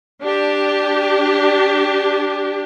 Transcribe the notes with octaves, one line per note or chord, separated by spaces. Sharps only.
D4 G4